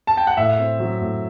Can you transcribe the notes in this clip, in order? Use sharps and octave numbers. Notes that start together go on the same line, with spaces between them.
A5
G5
F#5
A2 E5
C4
F#3
A2